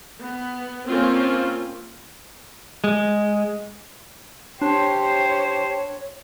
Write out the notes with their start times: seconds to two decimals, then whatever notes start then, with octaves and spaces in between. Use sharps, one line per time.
0.21 B3
0.89 A#3 C4 C#4 F4
2.84 G#3
4.62 D4 G4 C5 C#5